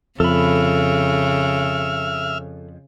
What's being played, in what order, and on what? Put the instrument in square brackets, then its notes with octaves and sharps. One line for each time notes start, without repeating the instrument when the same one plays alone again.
[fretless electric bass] F2 [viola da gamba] C#3 [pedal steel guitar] A4 B5 [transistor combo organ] E5 F6